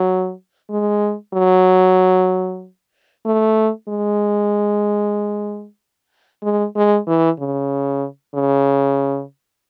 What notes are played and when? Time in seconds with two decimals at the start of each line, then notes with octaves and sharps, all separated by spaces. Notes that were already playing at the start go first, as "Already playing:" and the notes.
Already playing: F#3
0.70 G#3
1.33 F#3
3.25 A3
3.88 G#3
6.43 G#3
6.75 G#3
7.07 E3
7.39 C#3
8.34 C#3